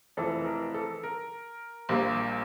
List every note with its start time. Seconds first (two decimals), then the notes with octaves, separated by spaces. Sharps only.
0.17 F1 F2 E3 A4
0.46 A#4
0.74 A4
1.03 A#4
1.89 A#1 A#2 G3 A#3